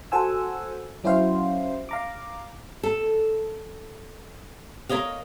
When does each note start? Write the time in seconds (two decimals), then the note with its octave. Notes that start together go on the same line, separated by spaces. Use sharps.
0.12 F#4 A4 C5 F#5 G#5 E6
1.04 F#3 C#4 E4 F#4 C5 F5
1.89 F5 A#5 D6
2.83 A4
4.89 A#4 B4 C#5 D#5 F5